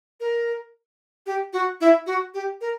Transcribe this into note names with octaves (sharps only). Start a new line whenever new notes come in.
A#4
G4
F#4
E4
F#4
G4
A#4